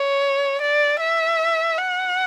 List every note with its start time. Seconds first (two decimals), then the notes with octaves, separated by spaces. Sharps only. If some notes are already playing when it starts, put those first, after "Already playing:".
Already playing: C#5
0.61 D5
1.00 E5
1.77 F#5